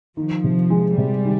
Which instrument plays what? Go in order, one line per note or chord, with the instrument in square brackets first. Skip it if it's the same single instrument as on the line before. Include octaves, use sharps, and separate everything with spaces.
[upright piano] D#3 [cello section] F3
[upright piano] C3
G#3
[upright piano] C3 [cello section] G3
[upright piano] D#3